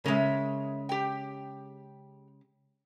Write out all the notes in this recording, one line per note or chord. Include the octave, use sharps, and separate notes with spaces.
C#3 G#3 A#4 E5
G4 G5